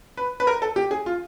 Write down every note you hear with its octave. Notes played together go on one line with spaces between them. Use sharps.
B4
B4
A#4
A4
G4
G#4
F4